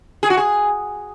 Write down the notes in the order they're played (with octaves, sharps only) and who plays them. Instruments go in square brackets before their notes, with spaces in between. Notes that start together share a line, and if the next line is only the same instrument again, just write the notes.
[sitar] G#4
F#4
G#4